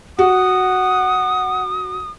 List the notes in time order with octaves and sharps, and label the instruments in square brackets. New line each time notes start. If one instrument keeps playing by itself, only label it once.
[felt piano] F#4 [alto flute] F#5 [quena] D#6